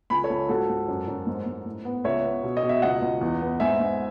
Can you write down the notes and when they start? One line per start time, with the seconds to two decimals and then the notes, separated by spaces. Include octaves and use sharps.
0.10 C#2 G#5 B5
0.23 A4 C#5
0.30 C#2
0.49 G#2 F#4 A4
0.69 G#2
0.88 F#2
1.08 F#2
1.27 G#2
1.46 G#2
1.66 A2
1.85 B3
2.04 C#2 C#5 E5
2.25 B3
2.43 B2
2.57 D#5
2.63 B2
2.69 E5
2.82 C#2 D#5 F#5
3.02 C#2
3.21 E2
3.42 B3
3.60 G#2 E5 G#5
3.80 G#2